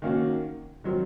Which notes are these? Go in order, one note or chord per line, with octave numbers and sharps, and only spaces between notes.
D#3 A#3 C#4 F#4
D#3 F#3 C4